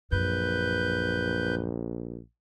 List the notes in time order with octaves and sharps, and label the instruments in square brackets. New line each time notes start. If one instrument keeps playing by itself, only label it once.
[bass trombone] A#1 [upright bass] F#2 [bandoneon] B4 G6